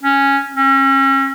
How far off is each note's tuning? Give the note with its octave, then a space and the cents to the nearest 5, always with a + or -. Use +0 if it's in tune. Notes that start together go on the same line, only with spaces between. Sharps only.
C#4 -5
C#4 -35